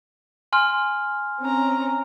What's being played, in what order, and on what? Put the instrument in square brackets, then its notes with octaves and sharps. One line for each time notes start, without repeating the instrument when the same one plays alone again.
[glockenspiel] G#5 C6 F6
[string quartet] C4 C#4 A#5